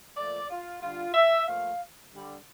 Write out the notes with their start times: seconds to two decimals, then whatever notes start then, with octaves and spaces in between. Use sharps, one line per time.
0.16 A#2 F3 A3 D5
0.49 F4
0.81 D3 G3 F4
1.14 E5
1.47 A#2 F3 A3 F5
2.12 D3 G3